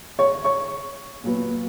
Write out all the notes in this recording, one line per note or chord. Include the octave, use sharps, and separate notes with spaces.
C#5 C#6
C#5 C#6
A#2 F#3 B3